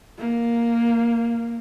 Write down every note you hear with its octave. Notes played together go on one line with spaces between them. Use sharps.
A#3